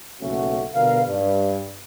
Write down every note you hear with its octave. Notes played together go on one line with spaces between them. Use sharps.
F#1 B1 A3 C#4 F#4
G1 B2 D3 A#4 B4 F5
G2